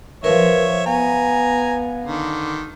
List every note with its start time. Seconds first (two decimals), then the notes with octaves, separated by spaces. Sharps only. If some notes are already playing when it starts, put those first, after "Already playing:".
0.24 F3 A#4 B4 C#5 E5
0.86 B3 F5 G#5 A#5
2.06 D3 D#3